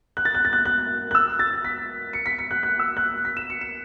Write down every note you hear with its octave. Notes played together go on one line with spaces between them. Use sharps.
F#6
A6
F#6
A6
F#6
F#6
F#6
E6
A6
B6
C#7
B6
C#7
F#6
F#6
E6
F#6
B6
E7
C#7
E7